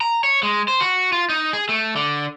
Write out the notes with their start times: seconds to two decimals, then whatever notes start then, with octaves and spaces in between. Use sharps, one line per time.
0.01 A#5
0.24 C#5
0.43 G#3
0.68 C5
0.81 F#4
1.12 F4
1.29 D#4
1.53 G#4
1.69 A3
1.96 D3